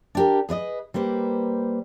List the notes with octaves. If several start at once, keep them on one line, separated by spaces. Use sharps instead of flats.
D4 G4 A#4
G#4 B4 D5 D#5
G3 A#3 B4 C5